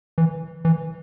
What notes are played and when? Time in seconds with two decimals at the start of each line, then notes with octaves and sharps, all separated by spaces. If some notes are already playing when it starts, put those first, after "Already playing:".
0.18 E3
0.65 E3